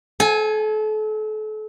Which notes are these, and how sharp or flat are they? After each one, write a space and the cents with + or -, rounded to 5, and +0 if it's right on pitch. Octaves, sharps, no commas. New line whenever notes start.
A4 -35 G#5 +0